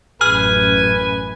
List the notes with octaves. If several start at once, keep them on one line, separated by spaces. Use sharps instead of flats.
A1 F#2 B4 G#5 F6